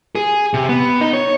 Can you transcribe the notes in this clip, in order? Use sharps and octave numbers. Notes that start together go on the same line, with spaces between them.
G#4
C3
B3
D#4
C#5